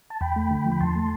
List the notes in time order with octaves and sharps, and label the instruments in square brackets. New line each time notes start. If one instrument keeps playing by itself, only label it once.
[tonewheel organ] A5
E2 G5 B5
A3
D3
F3
B5
E2 A5 C6
A3